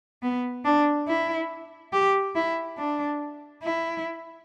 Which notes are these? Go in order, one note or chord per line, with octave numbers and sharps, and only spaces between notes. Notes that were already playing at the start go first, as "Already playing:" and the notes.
B3
D4
E4
G4
E4
D4
E4